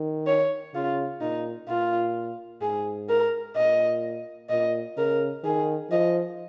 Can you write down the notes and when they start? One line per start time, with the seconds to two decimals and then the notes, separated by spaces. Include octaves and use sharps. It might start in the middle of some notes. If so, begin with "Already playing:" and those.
Already playing: D#3
0.27 C#5
0.74 C#3 F4
1.21 A#2 D#4
1.68 A#2 F4
2.61 G#2 G#4
3.09 A#4
3.56 A#2 D#5
4.50 A#2 D#5
4.97 C#3 A#4
5.44 D#3 G#4
5.90 F3 D#5